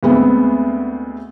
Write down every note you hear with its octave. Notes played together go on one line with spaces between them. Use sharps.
D2 G#3 B3 C4